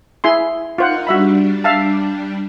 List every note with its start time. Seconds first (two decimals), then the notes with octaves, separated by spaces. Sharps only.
0.24 E4 G#4 C6
0.78 D#4 F4 A#4 C5 F#5
1.07 G3 D4 F#4 E5 B5
1.64 E5 F5 A5